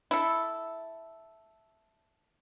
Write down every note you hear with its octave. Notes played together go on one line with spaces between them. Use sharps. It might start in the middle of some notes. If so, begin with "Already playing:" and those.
E4 A4